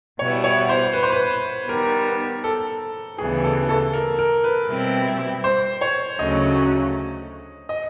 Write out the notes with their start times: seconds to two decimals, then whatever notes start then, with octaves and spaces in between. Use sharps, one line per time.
0.19 B2 G3 B3 E4 C#5
0.44 C#5
0.69 C5
0.94 B4
1.03 C5
1.12 B4
1.69 D#3 G3 B3 A#4
2.44 A4
3.18 D2 C#3 E3 G3 B3 G#4
3.44 A4
3.69 A4
3.93 A#4
4.19 A#4
4.44 B4
4.68 B2 G3 C4 E4 G4
5.44 C5
5.81 C#5
6.19 D2 C#3 F#3 A3 C#4 D#5
7.69 D#5